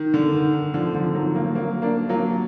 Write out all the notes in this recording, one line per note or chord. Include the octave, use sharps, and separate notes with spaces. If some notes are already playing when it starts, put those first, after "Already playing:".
Already playing: D#3
D3
D#3
D#3
D3 F3
D3 F3
D#3 F#3
F#3 A#3
F#3 A#3
A#3 D4
F#3 A#3